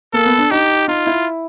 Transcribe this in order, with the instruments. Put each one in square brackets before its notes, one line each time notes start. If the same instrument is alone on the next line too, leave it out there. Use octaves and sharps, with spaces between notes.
[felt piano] A#3 [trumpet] A4
[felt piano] B3
D4
[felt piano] D#4 [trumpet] G4
[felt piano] D#4 [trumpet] F4
[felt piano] E4